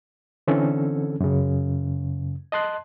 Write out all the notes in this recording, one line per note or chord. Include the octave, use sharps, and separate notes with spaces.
D3 E3 C4 C#4 A4
F#2 C#3
D#5 A5 C6 F#6